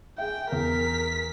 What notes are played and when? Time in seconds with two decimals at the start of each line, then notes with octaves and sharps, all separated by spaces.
0.18 G#4 E5 G5
0.52 E2 A#4 B6